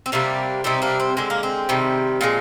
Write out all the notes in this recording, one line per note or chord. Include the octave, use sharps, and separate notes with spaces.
C4
C3 G3 A#3 D4
C3 G3 C4 D#4
A#3 D4
C4
D3 G#3 C4
A#3
C4
C3 D#3 G3
A#2 F3 G#3